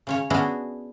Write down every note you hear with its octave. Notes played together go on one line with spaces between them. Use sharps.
C#3 C#4 C#5
B3 C#4 D4 E4 F#4 G#4